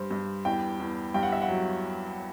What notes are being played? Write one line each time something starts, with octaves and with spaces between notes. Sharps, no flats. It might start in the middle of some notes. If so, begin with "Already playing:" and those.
Already playing: G2 C5
G2
E2 G5
E2
G2 G5
F#5
E5
F#5
F#3